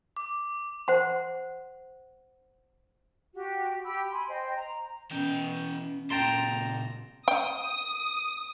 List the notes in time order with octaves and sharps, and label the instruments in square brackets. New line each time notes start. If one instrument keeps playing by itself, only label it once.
[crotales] D6
[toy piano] C5 F#5 C6
[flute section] F#4 G4
G4 B5 E6
G#5 B5 C6
C5 D#5 G5
A#5
[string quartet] B2 [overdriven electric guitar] E3 G5 [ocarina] C#4
[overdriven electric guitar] A#2 C#3 [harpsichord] G5 A5 C6 [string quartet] A#5
[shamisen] G5 [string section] D#6